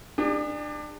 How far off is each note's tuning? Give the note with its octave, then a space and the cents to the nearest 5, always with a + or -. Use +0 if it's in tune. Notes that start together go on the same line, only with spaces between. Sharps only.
D4 +25 G#4 -45